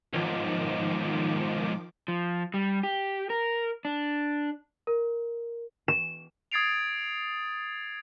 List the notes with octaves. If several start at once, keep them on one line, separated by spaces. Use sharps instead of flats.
B1 G#2 D#3 F3 D6
F3
G3
G4
A#4
D4
A#4
E7
D#6 G#6 A6 C7 D7 F7